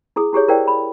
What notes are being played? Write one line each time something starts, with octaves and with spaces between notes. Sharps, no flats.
E4 G#4 D#6
E4 G4 G#4 C#5
E4 A#4 C5 D5 F5 G5
B5